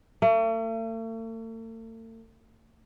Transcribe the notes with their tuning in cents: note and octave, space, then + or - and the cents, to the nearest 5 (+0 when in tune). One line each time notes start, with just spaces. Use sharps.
A3 +45